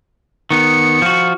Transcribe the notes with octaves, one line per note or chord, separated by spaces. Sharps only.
D#3 B3 C#7
F3 F#4